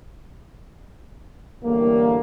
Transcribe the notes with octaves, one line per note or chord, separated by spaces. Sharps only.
E2 A2 D3 G3 A#3